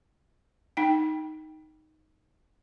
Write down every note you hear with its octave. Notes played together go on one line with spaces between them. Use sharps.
D#4 G5